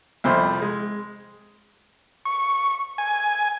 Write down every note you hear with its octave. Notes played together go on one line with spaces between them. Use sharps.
C2 F2 C5 E5 B5
G#3
C#6
G#5